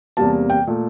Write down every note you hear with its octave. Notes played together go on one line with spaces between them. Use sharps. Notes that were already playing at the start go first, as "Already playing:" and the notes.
E2 C3 G3 A#3 A5
G5
A#2 A3